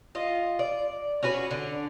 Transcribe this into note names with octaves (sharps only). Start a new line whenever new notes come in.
F4 D#5
D5
C#4 F#4 G#4 B4
D3